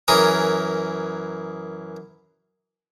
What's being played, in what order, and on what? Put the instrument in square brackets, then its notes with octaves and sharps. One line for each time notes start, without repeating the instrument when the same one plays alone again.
[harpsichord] F#2 E3 G#4 A#4 C#5 D#6